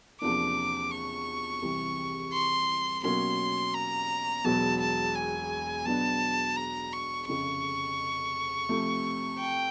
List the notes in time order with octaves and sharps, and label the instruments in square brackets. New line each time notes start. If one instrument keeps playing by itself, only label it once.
[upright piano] E2 C3 F3 A#3 D4 [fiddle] D6
[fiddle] C#6
[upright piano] C2 C3 E3
[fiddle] C6
[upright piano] B2 F#3 A#3 C#4 [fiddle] C6
[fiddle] A#5
[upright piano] E1 E2 B2 F#3 B3 [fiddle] A5
[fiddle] A5
G#5
[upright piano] B2 F#3 B3 D4 [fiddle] A5
[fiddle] A#5
C#6
[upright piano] F1 F2 C#3 [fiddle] C#6
[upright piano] C3 F3 A3
[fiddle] G5